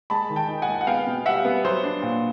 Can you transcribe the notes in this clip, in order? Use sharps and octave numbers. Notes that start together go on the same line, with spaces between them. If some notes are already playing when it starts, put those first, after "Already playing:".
G#3 A5 B5
D#3
G5 A5
D#4
F#5 G#5
G#3
F#5
B3 F5 G5
B2
G3 E5 F#5
B3
F#3 C5
D4
A#2